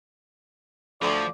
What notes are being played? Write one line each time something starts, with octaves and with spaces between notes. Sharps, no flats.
D2 F3 D5